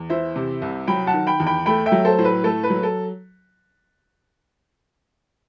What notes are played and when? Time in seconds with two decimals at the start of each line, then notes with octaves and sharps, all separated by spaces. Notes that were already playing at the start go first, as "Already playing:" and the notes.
Already playing: E2
0.10 E3 C5 E5
0.36 C3
0.62 C2
0.88 F#3 G5 B5
1.07 F#5 A5
1.14 D#3
1.27 G5 B5
1.40 E2
1.47 G5 B5
1.66 A3 G5 B5
1.86 E5 G5
1.92 F#3
2.05 A4 C5
2.18 A2 C5
2.25 B4
2.44 A3 A4
2.63 B4
2.70 F#3
2.83 A4